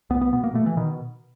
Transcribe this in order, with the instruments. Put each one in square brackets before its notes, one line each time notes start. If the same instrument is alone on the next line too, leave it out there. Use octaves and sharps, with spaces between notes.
[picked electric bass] C2 B3
B3
B2 B3
A#3
B2 A3
E3
B2 D#3